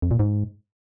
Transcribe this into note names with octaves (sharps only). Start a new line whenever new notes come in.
F2
A#2
G#2